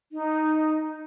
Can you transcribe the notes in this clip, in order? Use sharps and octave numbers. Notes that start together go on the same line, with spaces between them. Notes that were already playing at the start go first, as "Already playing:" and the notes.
D#4